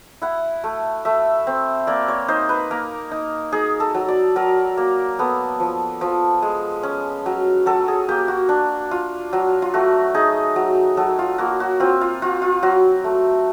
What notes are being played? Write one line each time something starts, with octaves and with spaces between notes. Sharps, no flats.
E4 F#5
A3
A3 E5
C4
A#3 D5
C#5
D#4 C5
B4
A#3 A#4
D#4
D#4 G#4
A4
F#3
D5
F#3 A#4
A#3
B3 A4
F3
F3
G#3
C#4
F#3
F#3 A4
G#4
A#3 G4
F#4
D4
F4
F#3
F4
A3 F#4
D#4 G#4
F#3
F#3 A4
F4
A#3 F#4
F#4
C4 F4
F4
F4 F#4
F4
F#3 F#4
A3